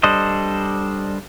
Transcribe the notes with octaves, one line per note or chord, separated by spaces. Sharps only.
G3 D4 A4 C5 D#5